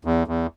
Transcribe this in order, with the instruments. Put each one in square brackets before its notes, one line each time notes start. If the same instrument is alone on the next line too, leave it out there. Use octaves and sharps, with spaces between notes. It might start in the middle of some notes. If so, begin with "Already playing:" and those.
[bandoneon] E2
E2